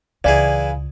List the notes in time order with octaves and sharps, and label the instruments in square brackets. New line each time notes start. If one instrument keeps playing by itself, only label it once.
[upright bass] C#2 [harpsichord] E3 E4 G#4 [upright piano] D5 [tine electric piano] F5 G#5